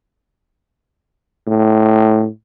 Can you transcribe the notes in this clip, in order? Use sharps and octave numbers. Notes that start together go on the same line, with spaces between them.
A2